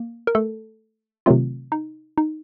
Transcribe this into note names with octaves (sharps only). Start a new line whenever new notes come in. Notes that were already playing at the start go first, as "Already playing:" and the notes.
Already playing: A#3
A#4
A3 A4
C3 D#3 F#3 A3 C4 F4
D#4
D#4